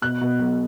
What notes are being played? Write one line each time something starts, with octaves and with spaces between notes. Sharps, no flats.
B2 F#6
B2
B1